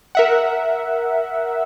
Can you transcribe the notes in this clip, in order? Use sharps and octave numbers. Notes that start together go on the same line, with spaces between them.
A#4 E5 F#5